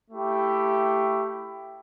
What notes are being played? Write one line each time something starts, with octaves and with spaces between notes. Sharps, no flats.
A3 E4 G4